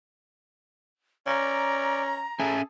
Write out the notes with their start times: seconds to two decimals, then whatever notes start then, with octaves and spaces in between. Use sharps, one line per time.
1.27 C#4 D5 A#5
2.39 C#4 G#4 A4 E5 G#5